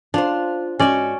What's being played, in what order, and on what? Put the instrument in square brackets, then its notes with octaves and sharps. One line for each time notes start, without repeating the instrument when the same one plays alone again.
[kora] D4 [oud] F4 C5
[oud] G#2 F#4 [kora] C#4 D5